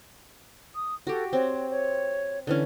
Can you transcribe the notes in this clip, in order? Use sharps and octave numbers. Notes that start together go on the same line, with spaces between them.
D#6
F#4 G4 A4
C4 C#5
C#5
D3 E3 C#4